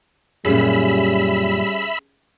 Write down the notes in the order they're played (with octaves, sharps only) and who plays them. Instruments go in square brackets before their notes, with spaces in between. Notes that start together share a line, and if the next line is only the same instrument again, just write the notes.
[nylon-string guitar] F#2 A#2 [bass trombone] G3 [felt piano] C#4 G4 G#4 [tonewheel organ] E5 B5